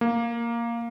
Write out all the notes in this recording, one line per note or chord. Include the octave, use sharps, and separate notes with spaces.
A#3